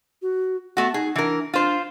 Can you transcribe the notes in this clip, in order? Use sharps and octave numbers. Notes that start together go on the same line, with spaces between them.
F#4
A3 B3 F#4
D#4 G#4
E3 D4 A#4
D4 F4 C5